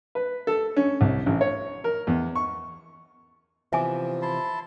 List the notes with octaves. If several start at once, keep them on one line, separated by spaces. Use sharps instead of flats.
B4
A4
C#4
C2
A1
C#5
A#4
E2
C#6
C3 E3 F3 B3 E5 G#5 D6
E4 A5 C6